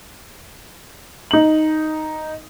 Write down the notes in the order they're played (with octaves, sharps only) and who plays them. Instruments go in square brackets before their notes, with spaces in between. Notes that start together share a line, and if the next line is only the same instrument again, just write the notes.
[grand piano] D#4 F#7